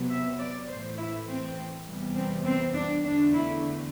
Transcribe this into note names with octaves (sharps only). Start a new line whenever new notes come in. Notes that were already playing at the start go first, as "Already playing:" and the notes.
Already playing: C3 F#3 B3
E5
D5
A2 E3 A3 C5
E4
C4
E2 C3 E3 G3 B3
C4
C4
D4
E2 D3 A3 D4
E4